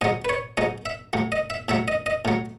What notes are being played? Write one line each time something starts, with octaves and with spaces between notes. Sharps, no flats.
G#2 F#3 D#5
B4
C#5
G#2 F#3 D#5
E5
A2 F#3
D#5
E5
A2 F#3 E5
D#5
D#5
A2 F#3